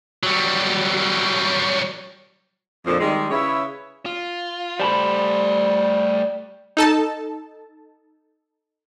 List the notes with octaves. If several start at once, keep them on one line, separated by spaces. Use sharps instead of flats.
F#3 G3
F2 A#2 D3 F3
D#3 G3 G#3
C#3 E4 B4 C#5 E5
F4
G3 A3 C5 A5 B5
D#4 A4 A5